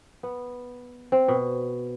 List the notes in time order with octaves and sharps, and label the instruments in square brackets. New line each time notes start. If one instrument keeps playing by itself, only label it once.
[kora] B3
C4
B2